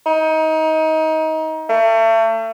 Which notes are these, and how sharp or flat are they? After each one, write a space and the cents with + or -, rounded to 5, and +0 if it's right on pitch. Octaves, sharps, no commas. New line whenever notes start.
D#4 +25
A3 +35